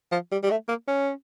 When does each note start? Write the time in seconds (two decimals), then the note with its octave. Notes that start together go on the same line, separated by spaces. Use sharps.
0.12 F3
0.31 G3
0.43 G3
0.50 A3
0.68 A#3
0.88 C#4